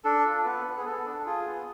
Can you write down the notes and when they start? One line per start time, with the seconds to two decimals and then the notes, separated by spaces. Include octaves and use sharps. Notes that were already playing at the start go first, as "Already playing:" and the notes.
0.04 D4 A4
0.26 F4
0.45 B3 B4
0.65 B3
0.77 G#4
0.86 B3 A4
1.05 D4
1.26 F4 G#4
1.47 B3